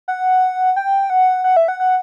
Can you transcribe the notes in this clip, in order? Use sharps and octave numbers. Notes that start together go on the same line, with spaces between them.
F#5
G5
F#5
F#5
E5
F#5
F#5